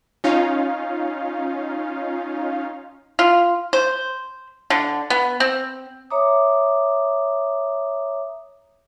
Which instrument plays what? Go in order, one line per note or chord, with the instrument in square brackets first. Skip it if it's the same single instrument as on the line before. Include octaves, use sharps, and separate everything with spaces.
[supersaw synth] C#4 D#4 F4 F5
[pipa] F4
C5
D3
B3
C4
[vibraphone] C#5 E5 A#5 D6 D#6